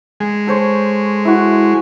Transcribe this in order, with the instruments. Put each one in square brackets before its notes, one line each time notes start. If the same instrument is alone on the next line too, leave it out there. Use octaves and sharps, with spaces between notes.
[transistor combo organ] G#3
[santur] A4 C5 C#5
E4 F#4